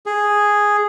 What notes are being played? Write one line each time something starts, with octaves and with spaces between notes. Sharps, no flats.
G#4